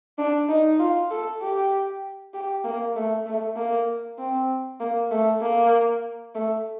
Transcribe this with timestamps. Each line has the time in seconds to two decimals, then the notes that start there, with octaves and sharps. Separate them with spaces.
0.18 D4
0.49 D#4
0.80 F4
1.11 A4
1.41 G4
2.34 G4
2.64 A#3
2.96 A3
3.26 A3
3.57 A#3
4.19 C4
4.80 A#3
5.11 A3
5.42 A#3
6.34 A3